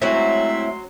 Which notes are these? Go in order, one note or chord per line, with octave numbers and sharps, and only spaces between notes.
F#3 G#3 A3 C4 C#4 E4 E5 C6